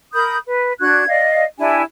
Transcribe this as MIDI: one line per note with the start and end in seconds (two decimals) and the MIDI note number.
0.13 0.37 70
0.13 0.37 83
0.13 0.37 87
0.13 0.37 91
0.46 0.72 71
0.80 1.07 62
0.80 1.07 66
0.80 1.07 90
0.80 1.07 92
1.07 1.44 74
1.07 1.44 75
1.07 1.44 77
1.59 1.82 62
1.59 1.82 64
1.59 1.82 67
1.59 1.82 80